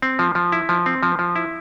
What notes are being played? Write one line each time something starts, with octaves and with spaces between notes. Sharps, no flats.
C4
F3
F3
E4
F3
C4
F3
F3
E4